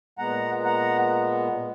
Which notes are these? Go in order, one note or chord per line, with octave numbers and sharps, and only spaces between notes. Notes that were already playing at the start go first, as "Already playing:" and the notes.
A#2 G#3 B3 F#5 A#5
F#5 A#5